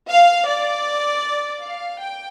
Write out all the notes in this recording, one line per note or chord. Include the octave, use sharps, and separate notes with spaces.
F5
D5
F5
G5